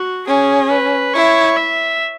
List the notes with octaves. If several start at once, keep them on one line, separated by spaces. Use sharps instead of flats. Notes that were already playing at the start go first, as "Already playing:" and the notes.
Already playing: F#4
C#4 G#4
B4
E4 C#5
E5